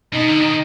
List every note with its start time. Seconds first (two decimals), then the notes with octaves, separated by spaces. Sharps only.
0.13 B2 D#4
0.29 D3
0.42 D#3